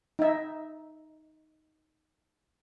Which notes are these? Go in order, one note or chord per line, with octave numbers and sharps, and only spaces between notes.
D#4 E5